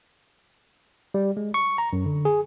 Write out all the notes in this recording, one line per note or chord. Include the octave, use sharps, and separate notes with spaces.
G3
G#3
C#6
A#5
F#2
D3
G#4